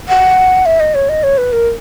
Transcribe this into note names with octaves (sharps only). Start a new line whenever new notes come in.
F#5
E5
D#5
C#5
D#5
C#5
B4
A#4